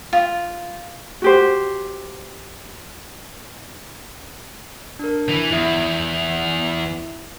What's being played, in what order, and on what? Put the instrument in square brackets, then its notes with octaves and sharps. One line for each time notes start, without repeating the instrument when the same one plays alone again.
[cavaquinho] F4
[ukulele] F#4 G4 C5
[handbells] D4 A#4
[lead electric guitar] E3
[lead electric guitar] E2 [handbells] E4 E5 D#6